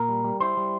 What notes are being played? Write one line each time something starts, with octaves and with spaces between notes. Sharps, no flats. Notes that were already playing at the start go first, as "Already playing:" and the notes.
Already playing: A#2 A#4
G3
G3
E4 C5
G3